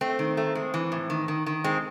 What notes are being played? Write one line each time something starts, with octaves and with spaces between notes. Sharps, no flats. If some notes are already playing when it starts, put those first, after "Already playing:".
A3 C4
D#3
A3
G#3
E3
A2
D#3
D#3
D#3
G#3 C4